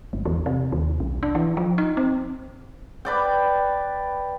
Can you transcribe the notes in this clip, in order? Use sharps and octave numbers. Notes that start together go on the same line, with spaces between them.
G1
E2
C3
D#2
B1
D4
E3
F3
D#4
C4
B4 D5 G5